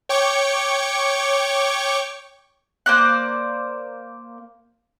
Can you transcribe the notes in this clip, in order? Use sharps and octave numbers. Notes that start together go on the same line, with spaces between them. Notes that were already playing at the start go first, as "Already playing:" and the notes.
C#5 G5 C#6 D6
A#3 C5 D5 F#6